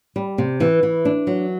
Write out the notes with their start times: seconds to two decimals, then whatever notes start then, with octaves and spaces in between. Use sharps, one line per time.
0.16 G3
0.38 C3
0.60 E3
0.83 E3
1.05 D4
1.27 F#3